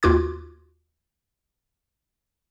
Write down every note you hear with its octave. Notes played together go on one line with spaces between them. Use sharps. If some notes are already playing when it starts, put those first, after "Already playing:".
D#2 F4 F#4 D6 G#6